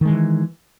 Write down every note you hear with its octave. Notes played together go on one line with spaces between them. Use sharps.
D#3 E3 G#3